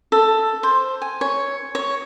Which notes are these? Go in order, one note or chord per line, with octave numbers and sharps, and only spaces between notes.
A4
C5
G#5
C#5
C#5